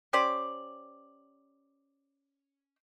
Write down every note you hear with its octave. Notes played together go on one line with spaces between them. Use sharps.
C#4 G4 C5 D5